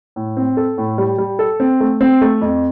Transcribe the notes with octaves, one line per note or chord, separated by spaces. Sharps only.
A2
C4
A4
A2
G3
G3
A4
C4
A3
C4
A3
F2